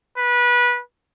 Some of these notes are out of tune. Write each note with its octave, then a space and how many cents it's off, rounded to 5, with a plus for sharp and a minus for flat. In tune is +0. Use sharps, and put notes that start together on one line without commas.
B4 -20